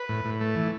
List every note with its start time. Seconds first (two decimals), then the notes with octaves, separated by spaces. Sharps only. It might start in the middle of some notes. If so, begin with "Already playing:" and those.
Already playing: B4
0.09 A2
0.25 A2
0.41 A3
0.56 E3